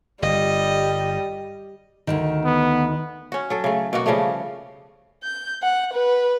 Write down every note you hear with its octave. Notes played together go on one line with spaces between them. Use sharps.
G1 G3 D#5
D2 G2 D#3
B3
C#4 F#4
F#3 A4
C#3 A3
B2 A#3 F#4
C#3 F3 G3 A3
G6
F#5
B4